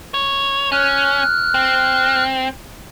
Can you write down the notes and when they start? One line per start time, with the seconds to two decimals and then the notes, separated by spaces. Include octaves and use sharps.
0.14 C#5
0.72 C#4 F6 F#6
1.54 C4